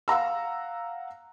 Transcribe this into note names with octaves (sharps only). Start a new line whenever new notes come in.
F5 F#5 A#5 E6